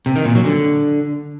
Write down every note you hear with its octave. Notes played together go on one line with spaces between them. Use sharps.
C3
D#3
A#2
F#3
D3